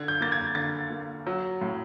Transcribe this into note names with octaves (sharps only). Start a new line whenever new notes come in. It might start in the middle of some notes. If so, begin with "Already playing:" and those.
Already playing: D3 G#6
G6
A#3 A6
G#6
D3 A6
A#3
F#3
A2